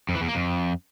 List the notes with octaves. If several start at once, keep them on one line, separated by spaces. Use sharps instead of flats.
F2
E3
E2
A#3
F2